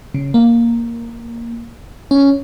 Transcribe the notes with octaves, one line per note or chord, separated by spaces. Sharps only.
C#3
A#3
C#4